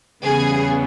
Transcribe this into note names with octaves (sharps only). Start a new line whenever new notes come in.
E2 C#3 G3 B3 G#4